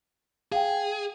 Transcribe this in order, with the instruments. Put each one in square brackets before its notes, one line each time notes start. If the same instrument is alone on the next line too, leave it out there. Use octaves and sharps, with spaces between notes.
[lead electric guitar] G#4 [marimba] F5 G5